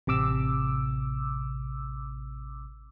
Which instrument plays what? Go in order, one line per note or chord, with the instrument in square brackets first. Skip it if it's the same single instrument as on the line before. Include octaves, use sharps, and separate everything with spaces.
[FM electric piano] A1 C3 D6 E6